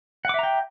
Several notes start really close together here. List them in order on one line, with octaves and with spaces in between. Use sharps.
F#5 D6 E5 A#5 G5